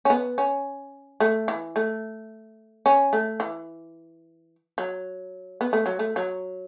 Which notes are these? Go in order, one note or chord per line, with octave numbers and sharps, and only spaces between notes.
C#4
B3
C#4
A3
E3
A3
C#4
A3
E3
F#3
B3
A3
F#3
A3
F#3